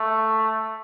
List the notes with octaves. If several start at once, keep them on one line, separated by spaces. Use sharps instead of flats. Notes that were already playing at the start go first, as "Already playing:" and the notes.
Already playing: A3